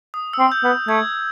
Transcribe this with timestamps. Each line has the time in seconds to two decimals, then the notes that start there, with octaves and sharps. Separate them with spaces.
0.14 D#6
0.33 E6
0.39 C4
0.52 G6
0.64 B3
0.88 A3 G#6